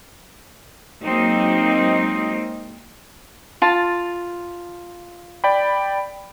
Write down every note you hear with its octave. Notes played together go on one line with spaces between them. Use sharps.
F#3 G#3 A#3 C4 D#4
F4 A5
D5 G5 B5